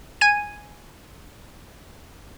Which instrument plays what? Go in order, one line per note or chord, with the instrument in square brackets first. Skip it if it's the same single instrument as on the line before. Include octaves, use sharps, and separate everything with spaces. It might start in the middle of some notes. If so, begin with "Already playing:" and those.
[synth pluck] G#5 G#6 D#7